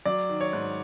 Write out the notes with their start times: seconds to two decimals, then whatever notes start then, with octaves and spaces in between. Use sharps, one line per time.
0.05 F#3 D5
0.29 D#3
0.41 C#5
0.53 G#2